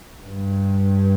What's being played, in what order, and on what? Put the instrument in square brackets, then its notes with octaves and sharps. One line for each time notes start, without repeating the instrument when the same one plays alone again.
[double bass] G2